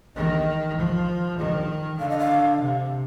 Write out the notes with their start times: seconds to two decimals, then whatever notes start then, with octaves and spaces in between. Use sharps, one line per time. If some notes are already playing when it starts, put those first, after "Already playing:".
0.16 D#3 D#5
0.77 F3
1.39 D#3 D#5
1.99 D3 F5
2.10 D#5
2.19 F5
2.61 C3